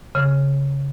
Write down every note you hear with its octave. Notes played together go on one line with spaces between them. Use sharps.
C#3